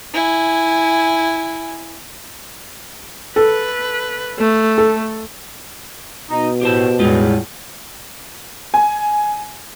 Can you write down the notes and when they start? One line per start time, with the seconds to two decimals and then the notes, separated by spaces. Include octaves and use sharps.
0.14 E4 G#5
3.36 A4 B4
4.38 A3
4.78 A4
6.30 B2 D#4
6.61 A2 G4 C5 A5
6.99 E2 A2 G3 G#3 F4
8.74 G#5